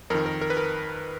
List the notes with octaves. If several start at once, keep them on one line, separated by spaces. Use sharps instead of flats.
F2 D#3 A#4
A#4
A#4
B4
A#4